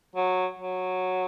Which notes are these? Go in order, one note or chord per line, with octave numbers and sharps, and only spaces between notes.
F#3
F#3